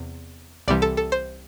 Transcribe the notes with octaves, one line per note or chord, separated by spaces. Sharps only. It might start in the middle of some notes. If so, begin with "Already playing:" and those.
Already playing: E2 C3
C2 C3 E3 G3 D5
A4
A4
C5